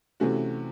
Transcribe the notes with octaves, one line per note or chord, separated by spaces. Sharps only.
C3 E3 A3 C#4 F#4